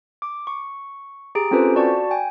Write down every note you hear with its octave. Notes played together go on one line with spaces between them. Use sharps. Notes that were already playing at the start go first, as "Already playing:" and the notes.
D6
C#6
G4 G#4 A#5 D7
C4 C#4 F4 A4 B4 C5
F#4 D5 A5 C#6
G5 G#5